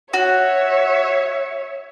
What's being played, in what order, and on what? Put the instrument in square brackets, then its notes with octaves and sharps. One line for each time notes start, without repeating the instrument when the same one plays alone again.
[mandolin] F#4 [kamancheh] C#5 E5